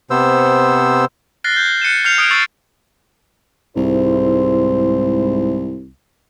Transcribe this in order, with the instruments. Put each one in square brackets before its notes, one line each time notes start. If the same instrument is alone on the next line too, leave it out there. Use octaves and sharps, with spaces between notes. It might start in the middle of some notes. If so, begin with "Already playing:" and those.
[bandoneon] C3 B3 C5 E6
[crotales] F6 F#6 A6 A#6 C7 G7
G6 G#6
F#6 C#7 D#7 E7
F6 G6 G#6 C7 C#7 F7
D#6 F#6 G#6 D7 F7
C#6 E6 A6 C7 D7 D#7
[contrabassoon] C2 [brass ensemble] G#2 E4 C5